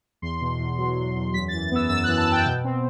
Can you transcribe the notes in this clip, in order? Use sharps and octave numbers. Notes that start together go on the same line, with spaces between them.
E2 C6
B2
E2
F#3
E2
E2
F#2 B6
A6
E3
B3 E6
F#2 E6
F#6
E3
A5
B3
G5
B2
C4